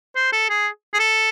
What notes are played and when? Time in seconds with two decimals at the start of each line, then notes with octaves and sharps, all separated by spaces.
0.16 C5
0.33 A4
0.50 G#4
0.94 G#4
1.00 A4